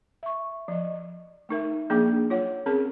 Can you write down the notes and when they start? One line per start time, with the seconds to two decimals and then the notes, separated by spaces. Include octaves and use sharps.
0.23 E5 C#6
0.68 F3 D#5
1.49 A3 D#4 A#4 E5
1.90 F3 A#3 D4 G#4 G5 D6
2.30 F#3 F4 C#5 F#5
2.66 C4 C#4 G#4 A#4 A5